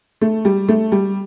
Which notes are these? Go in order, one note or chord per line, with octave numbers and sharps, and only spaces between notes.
A3
G3
A3
G3